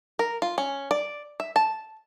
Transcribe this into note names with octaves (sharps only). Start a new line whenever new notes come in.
A#4
F4
C#4
D5
E5
A5